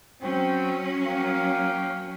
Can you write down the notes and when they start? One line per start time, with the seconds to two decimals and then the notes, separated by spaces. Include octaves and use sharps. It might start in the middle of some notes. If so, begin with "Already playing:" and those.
0.22 F#3 C4 C#4 G5
1.07 A#3 F5 G5